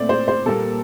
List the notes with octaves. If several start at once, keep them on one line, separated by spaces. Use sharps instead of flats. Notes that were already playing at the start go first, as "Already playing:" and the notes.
Already playing: A#2 A3 C4 D5
C5
C5
A#2 G3 A#3 A4